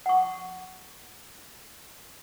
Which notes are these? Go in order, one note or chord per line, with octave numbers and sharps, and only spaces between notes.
F#5 C#6